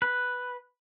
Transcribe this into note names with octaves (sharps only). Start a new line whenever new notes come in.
B4